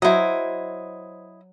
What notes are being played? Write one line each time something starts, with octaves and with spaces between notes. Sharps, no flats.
F#3 E4 C5 D#5